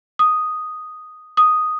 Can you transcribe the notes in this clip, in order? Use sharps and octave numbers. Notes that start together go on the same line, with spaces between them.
D#6
D#6